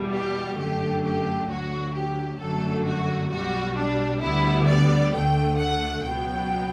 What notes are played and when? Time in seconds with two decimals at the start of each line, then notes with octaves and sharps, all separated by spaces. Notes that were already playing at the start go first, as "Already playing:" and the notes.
Already playing: E2 B2 G3
0.12 G4
0.57 G1 F#2 D3 A3 G4
1.04 G4
1.49 D2 D3 F#3 F#4
1.94 G4
2.39 G1 F#2 D3 F#3 A3 A4
2.85 F#4
3.30 B1 B2 G3 F#4
3.76 D4
4.21 D2 D3 G3 B3 E4
4.67 D5
5.13 D2 D3 A3 G5
5.58 F#5
6.03 C#2 B2 F#3 B3 G5